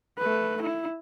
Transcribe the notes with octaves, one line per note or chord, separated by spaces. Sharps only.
A3 B4
E4